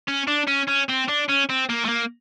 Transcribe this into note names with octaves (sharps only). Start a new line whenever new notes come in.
C#4
D4
C#4
C#4
C4
D4
C#4
C4
A#3
A3
A#3